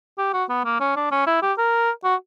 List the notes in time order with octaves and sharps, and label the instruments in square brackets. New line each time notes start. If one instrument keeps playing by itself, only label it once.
[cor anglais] G4
F#4
B3
A#3
C#4
D4
C#4
E4
G4
A#4
F#4